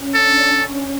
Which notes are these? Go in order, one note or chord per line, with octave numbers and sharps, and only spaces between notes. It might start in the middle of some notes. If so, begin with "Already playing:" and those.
Already playing: C#4
D4 A4
C#4